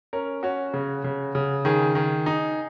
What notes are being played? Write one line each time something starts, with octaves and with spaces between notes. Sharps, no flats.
C#4 A#4
C#4 F#4
C#3
C#3
C#3
D#3 G#4
D#3
D#4